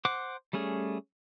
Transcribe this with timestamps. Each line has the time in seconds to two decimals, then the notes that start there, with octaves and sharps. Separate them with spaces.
0.05 C5 F#5 D6
0.53 G3 A3 C#4 G#4